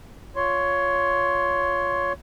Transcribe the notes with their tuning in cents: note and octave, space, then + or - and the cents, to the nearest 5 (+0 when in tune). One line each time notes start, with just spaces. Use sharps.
F4 +5 C#5 +15 C6 +10